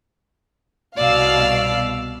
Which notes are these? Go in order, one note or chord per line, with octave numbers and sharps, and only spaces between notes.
C2 B2 D5 F5 E6